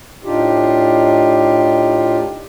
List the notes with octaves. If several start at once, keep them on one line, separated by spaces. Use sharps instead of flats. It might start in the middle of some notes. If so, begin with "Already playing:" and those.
A2 D4 D#4 F4 G4